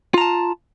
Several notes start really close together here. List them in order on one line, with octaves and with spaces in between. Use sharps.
F4 A#5 A5